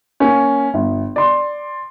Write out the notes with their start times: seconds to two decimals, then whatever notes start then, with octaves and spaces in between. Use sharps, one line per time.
0.20 A#3 C#4
0.74 G1
1.16 D5 C6